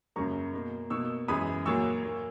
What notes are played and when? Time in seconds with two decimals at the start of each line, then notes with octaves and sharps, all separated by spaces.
0.16 F#2 C#3 F#3 A#3 A#5 C#6
0.53 B2 A#3
0.90 B2 A#3 C#6 E6
1.28 F#2 E3 G#3 B5 D#6
1.66 A#2 F#3 A#3 C#6 E6
2.03 A#2 A#3